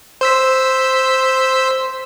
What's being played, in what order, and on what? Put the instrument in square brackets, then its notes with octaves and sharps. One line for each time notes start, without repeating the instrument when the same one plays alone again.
[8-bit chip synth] C5 E6 B6